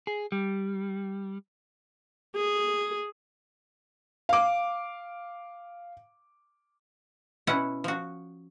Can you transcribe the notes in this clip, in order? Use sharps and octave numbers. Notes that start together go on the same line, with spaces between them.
G#4
G3
G#4
F5 D6
B2 C#4 E4 F#5
F3 F#4